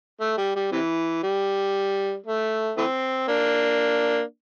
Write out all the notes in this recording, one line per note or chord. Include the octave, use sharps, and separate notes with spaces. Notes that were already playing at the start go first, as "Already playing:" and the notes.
A3
G3
G3
C3 E3
G3
A3
E3 A3 C4
A#3 D4